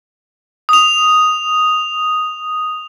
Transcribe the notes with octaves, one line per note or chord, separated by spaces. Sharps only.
D#6 F7